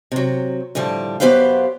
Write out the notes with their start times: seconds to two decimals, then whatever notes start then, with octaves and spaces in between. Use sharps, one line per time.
0.12 C3 F#3
0.75 A2 D3 F3 G3
1.20 F#2 B3 G4 B4 C5 F5